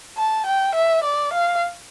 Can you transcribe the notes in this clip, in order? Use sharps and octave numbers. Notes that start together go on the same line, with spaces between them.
A5
G5
E5
D5
F5